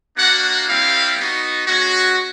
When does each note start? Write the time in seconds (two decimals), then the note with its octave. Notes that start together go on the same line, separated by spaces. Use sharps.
0.16 A#3 D4 F#4 F#5
0.67 G3 C4 E4 G4 F5
1.17 B3 D#4 F#4
1.67 G#3 C#4 F#4